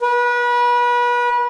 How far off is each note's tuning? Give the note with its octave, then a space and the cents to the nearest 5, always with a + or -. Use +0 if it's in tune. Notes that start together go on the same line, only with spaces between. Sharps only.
B4 -30